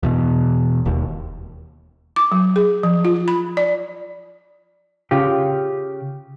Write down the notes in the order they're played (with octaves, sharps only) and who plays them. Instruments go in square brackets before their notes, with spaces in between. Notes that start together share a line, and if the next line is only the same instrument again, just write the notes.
[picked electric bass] E2 B2
E1 D#2
[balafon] D6
F#3
G#4
F3
F4
B5
D5
[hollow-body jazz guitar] C#3 F4 G4